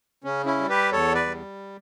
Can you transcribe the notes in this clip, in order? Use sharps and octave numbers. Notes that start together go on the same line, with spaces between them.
C#3 C#4
C#4 E4
G3
G4 B4
E2 A4 C#5
B4 D5
G3